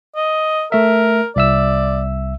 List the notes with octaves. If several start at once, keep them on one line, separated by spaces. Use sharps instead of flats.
D#5
A3 A#4 E5
C2 D5 E5 E6